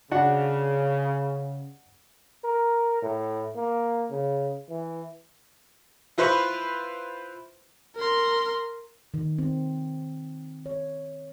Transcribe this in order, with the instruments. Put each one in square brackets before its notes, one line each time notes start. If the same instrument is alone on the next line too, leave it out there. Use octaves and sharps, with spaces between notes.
[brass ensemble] C#3 [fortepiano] D4 F#4 F#5
[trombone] A#4
A2
A#3
C#3
E3
[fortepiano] E4 F4 B4 C5 B5 C#6
[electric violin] A#4 C6
[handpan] D#3
C4
C#5